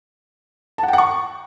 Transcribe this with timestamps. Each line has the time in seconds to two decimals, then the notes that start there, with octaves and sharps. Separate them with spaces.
0.78 A5
0.83 F#5
0.88 G5
0.93 F#5
0.98 C#6